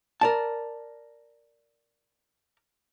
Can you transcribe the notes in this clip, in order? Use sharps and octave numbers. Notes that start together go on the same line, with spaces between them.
A#4 D5 A5